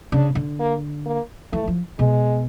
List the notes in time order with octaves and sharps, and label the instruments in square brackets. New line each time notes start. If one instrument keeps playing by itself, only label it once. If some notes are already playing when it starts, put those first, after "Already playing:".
[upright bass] C#3 [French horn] D4
[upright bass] D3
[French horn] A#3
A#3
[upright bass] E3 [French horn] A3
[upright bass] F3
[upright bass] B2 [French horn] G#3